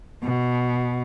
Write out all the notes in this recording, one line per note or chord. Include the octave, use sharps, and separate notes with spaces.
B2